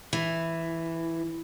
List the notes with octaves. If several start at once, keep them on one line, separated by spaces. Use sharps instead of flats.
E3